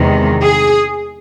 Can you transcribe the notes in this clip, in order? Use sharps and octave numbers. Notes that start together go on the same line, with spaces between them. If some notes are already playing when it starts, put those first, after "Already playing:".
Already playing: E2 C3 D#3 G#3
G#4